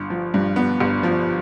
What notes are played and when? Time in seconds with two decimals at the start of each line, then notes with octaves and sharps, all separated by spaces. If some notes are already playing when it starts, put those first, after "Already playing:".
Already playing: G1
0.10 F3
0.34 G2
0.56 B3
0.80 G1
1.03 F3